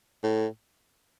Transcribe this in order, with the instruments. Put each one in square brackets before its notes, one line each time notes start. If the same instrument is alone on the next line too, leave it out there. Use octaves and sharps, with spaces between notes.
[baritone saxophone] A2